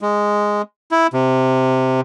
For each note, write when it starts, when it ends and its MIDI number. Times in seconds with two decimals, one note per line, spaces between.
0.01 0.62 56
0.91 1.07 64
1.13 2.01 48